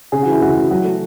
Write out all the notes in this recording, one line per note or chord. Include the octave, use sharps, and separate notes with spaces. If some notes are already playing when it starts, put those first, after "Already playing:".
C#3 G#4
E3 F#4
E4
D2 F#4
D2
F#3 F#4
A3